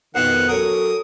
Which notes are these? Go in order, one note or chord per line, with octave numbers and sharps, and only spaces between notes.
F2 B2 D#3 F#5
F#3 C#4 A4 A#4 C#5 D#6